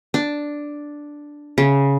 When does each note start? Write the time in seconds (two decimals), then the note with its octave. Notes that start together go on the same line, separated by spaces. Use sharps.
0.14 D4
1.58 C#3